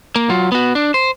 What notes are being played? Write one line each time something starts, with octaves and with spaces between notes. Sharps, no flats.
A#3
F#3 F4
B3 F#4
D4
C5